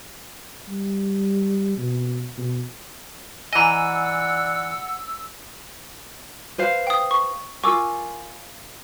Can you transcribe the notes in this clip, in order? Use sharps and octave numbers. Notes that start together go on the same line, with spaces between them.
G3
B2
B2
E3 D5 D#5 F#5 G#5 A#5 E6
B4 C5 F5
G5 D#6
C#6
F4 A#4 G#5 C#6 D6 E6